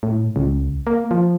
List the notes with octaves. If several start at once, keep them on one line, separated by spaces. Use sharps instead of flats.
A2
C#2
A#3
F3